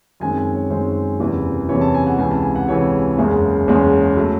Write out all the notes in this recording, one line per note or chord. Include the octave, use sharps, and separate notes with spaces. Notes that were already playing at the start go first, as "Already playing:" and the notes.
F#2 D#3 G#3 C4 G#5
G#5
C#5
F#2 D#3 G#3 C4 C5
F#1 E2 C3 E3
F#1 E2 C3 E3 C#5
A5
G#5
F#5
C#2 C3 E3 G#5
A5
G#5
F#5
C#2 C3 E3 C#5
F#1 E2 C#3 G#3 C#4 E5
F#1 E2 C#3 G#3 C#4
F#3 A3